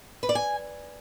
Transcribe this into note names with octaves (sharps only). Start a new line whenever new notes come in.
B4
D5
G#5